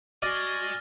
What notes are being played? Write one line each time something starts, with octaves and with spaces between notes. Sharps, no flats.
F#4 D5 D#5 G#5 F6 A6 A#6